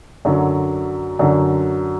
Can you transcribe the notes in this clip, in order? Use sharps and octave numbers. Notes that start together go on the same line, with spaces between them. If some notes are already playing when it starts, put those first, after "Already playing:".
F#2 D3 F#3
F#2 D3 F#3